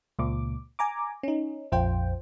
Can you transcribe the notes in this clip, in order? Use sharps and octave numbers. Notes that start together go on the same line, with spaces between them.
C#2 A#2 D6
G#5 A#5 D6
C#4 D#4
A#1 F2 F4 C5 G5